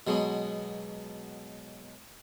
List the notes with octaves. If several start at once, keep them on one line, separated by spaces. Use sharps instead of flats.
B2 F#3 G#3 B3